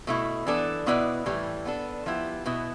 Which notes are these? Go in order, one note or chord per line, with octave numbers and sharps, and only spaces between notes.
B2 A3 E4
E3 B3 D4 A4
B2 B3 E4 B4 D5
A2 E3 G3
B3 D4 A4
F3 B3 E4 G4
B2 B3 E4